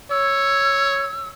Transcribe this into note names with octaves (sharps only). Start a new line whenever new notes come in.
C#5 E6